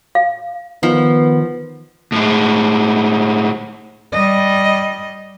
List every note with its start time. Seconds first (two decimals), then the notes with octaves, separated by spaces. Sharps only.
0.15 F5
0.83 D#3 F3 B3
2.12 A2 G#3
4.13 G3 D#5